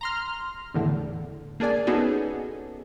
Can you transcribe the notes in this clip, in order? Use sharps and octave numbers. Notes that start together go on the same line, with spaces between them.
A#5 C6 F6
E2 A2 D3
A#3 D4 G#4 D5 G#5
B3 C#4 D#4 F#4 G#4 A4